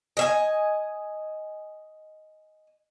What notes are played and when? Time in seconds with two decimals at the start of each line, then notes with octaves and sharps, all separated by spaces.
0.17 D#5 E5 G#5